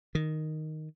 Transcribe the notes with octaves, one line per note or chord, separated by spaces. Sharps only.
D#3